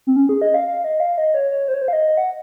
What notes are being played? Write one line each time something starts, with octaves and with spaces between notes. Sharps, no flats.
C4
C#4
G#4
D#5
F5
F5
D#5
F5
D#5
C#5
C#5
C5
C#5
C5
F5
D#5
F#5